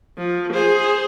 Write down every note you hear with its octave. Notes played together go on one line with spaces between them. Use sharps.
F3
G#4 C5